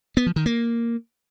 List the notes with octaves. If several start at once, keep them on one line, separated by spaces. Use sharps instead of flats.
B3
F3
D#3
A#3